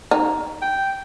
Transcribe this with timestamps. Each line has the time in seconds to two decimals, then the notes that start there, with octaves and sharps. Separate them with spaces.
0.11 D#4
0.62 G5